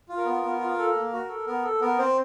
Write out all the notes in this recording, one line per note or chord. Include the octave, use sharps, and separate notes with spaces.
F4
A#4
B3
B3
F4
A4
A#3
F#4
A4
B3 A#4
A4
B3 A#4
C4 C5